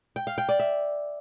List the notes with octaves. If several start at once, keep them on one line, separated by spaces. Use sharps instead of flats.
G5
F5
G5
D5
E5